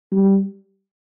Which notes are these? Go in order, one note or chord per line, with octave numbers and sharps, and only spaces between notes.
G3